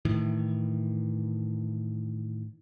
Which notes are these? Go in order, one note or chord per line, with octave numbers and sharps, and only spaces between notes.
A2 D#3 E3